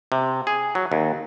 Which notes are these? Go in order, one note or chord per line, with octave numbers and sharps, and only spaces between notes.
C3
G#4
F#3
D#2